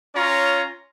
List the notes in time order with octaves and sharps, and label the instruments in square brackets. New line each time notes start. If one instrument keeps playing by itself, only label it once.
[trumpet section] C#4 F4 C#5 A#5